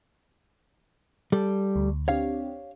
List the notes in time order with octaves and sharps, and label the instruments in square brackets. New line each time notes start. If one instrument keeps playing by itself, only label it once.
[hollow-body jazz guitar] G3 A4
[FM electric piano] D2
[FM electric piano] C4 D4 G4 [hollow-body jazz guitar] C#5 F5